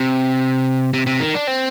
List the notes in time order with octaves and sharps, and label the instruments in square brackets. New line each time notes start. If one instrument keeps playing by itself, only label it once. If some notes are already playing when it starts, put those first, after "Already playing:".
Already playing: [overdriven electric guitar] C3
C3
C3
D#3
D4
C4